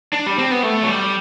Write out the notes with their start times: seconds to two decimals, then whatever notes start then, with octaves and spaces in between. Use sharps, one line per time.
0.13 D4
0.26 G3
0.39 C4
0.51 B3
0.63 A3
0.83 F#3
0.88 G3